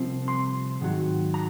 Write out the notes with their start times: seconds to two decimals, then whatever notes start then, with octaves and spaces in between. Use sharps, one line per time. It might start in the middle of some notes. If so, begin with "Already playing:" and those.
Already playing: C2 C3 F3 C4
0.28 C6
0.81 G#2 D#3 F#3
1.34 A#5